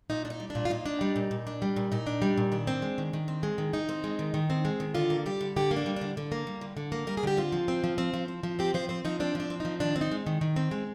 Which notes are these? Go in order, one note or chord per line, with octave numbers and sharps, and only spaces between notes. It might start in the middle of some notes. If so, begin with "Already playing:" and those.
A#2 D#4
D4
D#4
G3
D4
A#2
F4
A#2 D#4
D4
G3
A#2
A#2
D4
G3
A#2
A#2 D#4
D4
G3
A#2
D#3 D4
C4
G#3
D#3
D#3
C4
G#3
D#3
D#3 D#4
C4
G#3
D#3
D#3
C4
G#3
D#3
D3 F4
A#3
G3 G4
D3
D3 G4
A#3
D4
G3
D3 D4
D3
A#3
G3
D3
D3
A#3
G3 A#4
G#4
D3 G4
C4 F4
F3
C4
F3
C4
F3
C4
F3
C4 G4
F3 C5
C4 C5
F3 D#4
C4 D4
F3 D4
C4
F3 D#4
D#3 D4
C4
D#4
G#3
D#3
D#3
C4
G#3